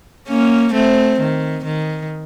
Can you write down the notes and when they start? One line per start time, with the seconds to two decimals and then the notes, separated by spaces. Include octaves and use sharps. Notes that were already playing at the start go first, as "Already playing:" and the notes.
0.28 A#3 C#4
0.73 A3 C4
1.20 D#3
1.64 D#3